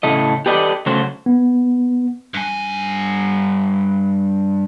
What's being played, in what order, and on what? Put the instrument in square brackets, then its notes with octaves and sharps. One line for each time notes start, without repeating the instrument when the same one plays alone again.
[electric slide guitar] A2 C#3 A3 D#5
G4 A4 B4 D5 D#5
C#3 F#3 A3 C5
[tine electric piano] B3
[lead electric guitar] G2 G#5